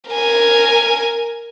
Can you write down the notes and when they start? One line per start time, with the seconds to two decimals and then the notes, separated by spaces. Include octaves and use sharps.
0.10 A#4 G#5